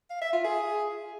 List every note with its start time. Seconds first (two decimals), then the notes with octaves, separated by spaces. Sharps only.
0.10 F5
0.22 E5
0.33 F4
0.44 G#4